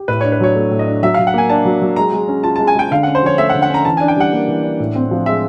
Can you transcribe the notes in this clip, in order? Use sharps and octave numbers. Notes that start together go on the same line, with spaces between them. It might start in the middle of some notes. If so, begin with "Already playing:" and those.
Already playing: G4
A2 B4
D4 C#5
B4
F#3 C#5
A3
A2
D#5
D4
F#3 E5
F#3 F5
F#5
A#3 G#5
D4 A5
F#3
F#3
G#3 A#5
G#3
C#4
F4 A5
G#3 A5
G#5
G#3 G5
D3 F5
C#4 F#5
C5
F3 C#5
A3 E5
F#5
D3
F#5
C#4 A#5
E3 A5
D4 G#5
G5
G3 F#5
A#3
E3
D4
A2
C4
F3
G#3 E5